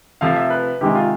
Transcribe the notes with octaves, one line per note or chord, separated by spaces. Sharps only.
C3 F3 A3 F5
E5
B4
C3 D#3 G#3 G4
F4